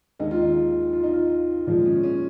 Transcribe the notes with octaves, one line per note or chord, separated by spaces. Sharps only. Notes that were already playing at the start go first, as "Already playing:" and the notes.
D#2 D#3 G#3 D#4
F4
D#4
F4
D#4
F4
A#2 F3 G#3 F4
C#4
C#4